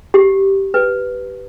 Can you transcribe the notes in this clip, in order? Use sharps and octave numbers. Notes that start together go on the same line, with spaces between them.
G4
B4